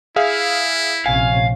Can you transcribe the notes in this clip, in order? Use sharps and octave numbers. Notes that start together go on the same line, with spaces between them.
E4 G#4 E5 F5
A#1 C3 C#4 F5 G#5